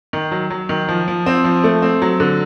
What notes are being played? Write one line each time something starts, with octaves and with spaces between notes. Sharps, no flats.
D#3
F#3
F#3
D#3
F3
F3
C4
F3
A3
C4
F#3
D3